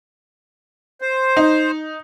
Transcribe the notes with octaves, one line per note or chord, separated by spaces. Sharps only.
C5
D#4